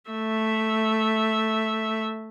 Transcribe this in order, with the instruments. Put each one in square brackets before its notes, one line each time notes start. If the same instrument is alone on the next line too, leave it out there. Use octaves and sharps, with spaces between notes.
[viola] A3 E5